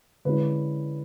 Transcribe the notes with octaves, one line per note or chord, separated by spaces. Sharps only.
D3 G#3 C#4 E4 B4